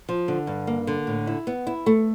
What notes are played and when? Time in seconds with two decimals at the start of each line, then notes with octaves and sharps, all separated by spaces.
0.09 F3
0.28 D3
0.47 G2
0.67 A#3
0.87 D3
1.07 A2
1.27 E4
1.47 B3
1.67 E4
1.86 A3